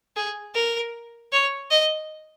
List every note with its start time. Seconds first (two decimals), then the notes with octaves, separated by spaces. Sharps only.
0.16 G#4
0.55 A#4
1.32 C#5
1.71 D#5